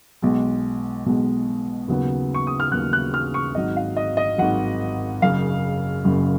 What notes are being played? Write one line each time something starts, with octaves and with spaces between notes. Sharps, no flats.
B1 B2 G#3
B1 B2 G#3
D#2 C#3 F#3 B3
C#6
D#6
F6
D#2 C#3 F#3 B3 F#6
F#6
F6
C#6
G#1 G#2 D#3 F#3 D#5
F5
D#5
D#5
G#1 G#2 D#3 F#3 F#5
F#1 F#2 C#3 F5
F#1 F#2 C#3